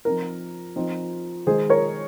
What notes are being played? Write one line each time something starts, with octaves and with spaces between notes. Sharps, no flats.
F3 C4 D#4 A#4
F3 C4 D#4
D#3 G#3 D#4 G#4 C5
A#4 C#5